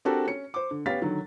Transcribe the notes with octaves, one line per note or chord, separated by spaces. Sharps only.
C4 D4 F#4 G4 A4 A#4
C#4 C#7
C5 D6
D3
B3 C#4 G4 F5 A6 B6
D3 D#3 F#3